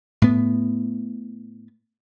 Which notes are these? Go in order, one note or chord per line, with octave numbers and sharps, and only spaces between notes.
A2 B3